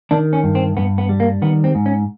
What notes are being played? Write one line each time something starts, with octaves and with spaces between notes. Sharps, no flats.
D#3 D4
C#4
G2
C4
G2 B3
B3
G3
A#3
D#3 B3
C4
G#2
C#4